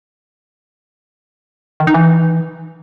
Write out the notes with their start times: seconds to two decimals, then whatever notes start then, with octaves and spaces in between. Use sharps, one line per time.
1.80 D#3
1.87 D#4
1.94 E3